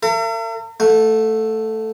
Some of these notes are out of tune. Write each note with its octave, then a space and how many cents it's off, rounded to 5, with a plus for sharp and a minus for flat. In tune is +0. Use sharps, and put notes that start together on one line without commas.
A#4 -45 E5 +45
A3 +0 F#5 -45